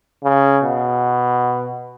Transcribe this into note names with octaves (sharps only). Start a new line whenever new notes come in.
C#3
B2